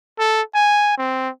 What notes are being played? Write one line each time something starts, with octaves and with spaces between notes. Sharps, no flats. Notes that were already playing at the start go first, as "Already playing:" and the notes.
A4
G#5
C4